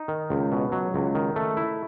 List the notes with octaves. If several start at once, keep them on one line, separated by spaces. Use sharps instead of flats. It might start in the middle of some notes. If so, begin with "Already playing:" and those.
Already playing: D#4
D#3
C#2
B2
F#3
C#2
D#3
A3
E4